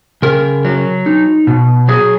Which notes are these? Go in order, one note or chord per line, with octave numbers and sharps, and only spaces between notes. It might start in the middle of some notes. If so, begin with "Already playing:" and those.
C#3 A#4
F#3
D#4
B2
F#3 G#4